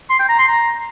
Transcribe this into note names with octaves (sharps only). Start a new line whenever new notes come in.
C6
G5
A#5
C6
A#5